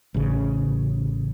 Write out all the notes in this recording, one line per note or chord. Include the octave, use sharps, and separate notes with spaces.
A1 C#3